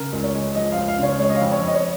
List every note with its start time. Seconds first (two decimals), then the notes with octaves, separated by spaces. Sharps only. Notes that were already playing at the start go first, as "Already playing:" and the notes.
Already playing: C#3 A#4
0.13 C#2
0.24 C#5
0.34 G#3
0.55 F3 D#5
0.72 F5
0.77 C#2
0.88 F5
0.99 C#3 C#5
1.20 G#3 C#5
1.30 D#5
1.35 F5
1.41 F2
1.52 C#5
1.62 F2
1.68 D#5
1.75 C#5